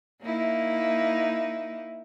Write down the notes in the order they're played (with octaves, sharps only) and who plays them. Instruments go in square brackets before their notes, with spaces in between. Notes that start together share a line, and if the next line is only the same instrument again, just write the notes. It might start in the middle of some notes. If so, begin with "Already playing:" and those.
[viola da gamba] A#3 D#4 E4